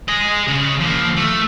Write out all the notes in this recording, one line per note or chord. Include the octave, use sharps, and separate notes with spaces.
G#4 D#5
C#3
F3 A#3
A3